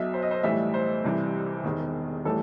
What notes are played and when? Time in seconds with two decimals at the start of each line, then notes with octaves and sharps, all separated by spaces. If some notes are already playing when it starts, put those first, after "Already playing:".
Already playing: B1 B2 F#3 E5
0.14 C5
0.22 D#5
0.31 C5
0.43 B1 A2 E3 G3 E5
0.74 C5
1.04 C2 C3 E3 G3
1.64 E1 E2 D#3
2.25 A2 E3 G3 A4